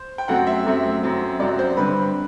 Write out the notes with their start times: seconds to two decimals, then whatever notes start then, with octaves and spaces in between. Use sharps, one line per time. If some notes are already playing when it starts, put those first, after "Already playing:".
Already playing: C5
0.18 G5
0.28 F#2 F#3 A3 C4 F#5
0.47 E5
0.66 F#2 F#3 A3 C4
1.03 F#2 F#3 C4
1.39 F#2 F#3 C4 D5
1.59 C5
1.77 G2 D3 G3 C4 B4